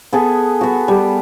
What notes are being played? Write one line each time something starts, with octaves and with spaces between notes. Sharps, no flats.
B3 G#4 A4
B3 F#4
G3